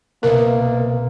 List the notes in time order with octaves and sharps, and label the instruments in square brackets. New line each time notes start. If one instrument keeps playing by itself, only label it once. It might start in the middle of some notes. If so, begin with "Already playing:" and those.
[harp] C2 B2 [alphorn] A#3 [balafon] A#4